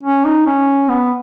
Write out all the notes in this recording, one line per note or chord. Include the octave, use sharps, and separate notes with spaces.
C#4
D#4
C#4
B3